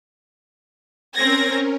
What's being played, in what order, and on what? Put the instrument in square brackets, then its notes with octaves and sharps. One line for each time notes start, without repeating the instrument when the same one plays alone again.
[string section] C4 G#6 A#6 [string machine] C#4 A#4